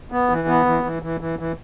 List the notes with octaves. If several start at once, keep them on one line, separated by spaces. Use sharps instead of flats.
B3
E3
B3
E3
E3
E3
E3
E3